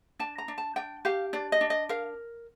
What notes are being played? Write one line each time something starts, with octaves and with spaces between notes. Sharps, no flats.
D4 A5
A#5
D4
A5
D4 G5
G4 F5
D4 D5
D#5
D4
D#5
A#4 F5